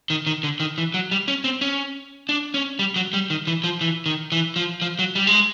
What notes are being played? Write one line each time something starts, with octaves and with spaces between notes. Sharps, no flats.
D#3
D#3
D3
D#3
E3
F#3
G3
C#4
C4
C#4
D4
C#4
G3
F#3
G3
D#3
E3
F3
E3
D#3
E3
F3
F3
F#3
G3
G#3